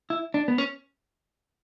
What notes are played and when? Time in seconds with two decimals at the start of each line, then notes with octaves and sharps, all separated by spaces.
0.10 E4
0.34 D4
0.48 B3
0.58 C#4